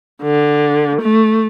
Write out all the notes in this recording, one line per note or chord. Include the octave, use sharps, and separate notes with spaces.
D3
A3